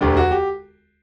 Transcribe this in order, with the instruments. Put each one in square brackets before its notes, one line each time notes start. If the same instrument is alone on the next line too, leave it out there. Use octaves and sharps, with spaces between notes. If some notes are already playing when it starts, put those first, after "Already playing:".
[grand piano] E1 D2 D3 G4
F#4
G4